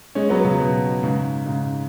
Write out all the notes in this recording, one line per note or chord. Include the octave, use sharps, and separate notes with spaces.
G#3 C#4
F#3 B3
C#3 F#3
B2
G#2 C#3
G#2 C#3